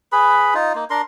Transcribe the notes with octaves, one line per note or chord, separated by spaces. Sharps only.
G#4 B4 B5
D#4 F4
A#3 D#4
D4 A#4 C6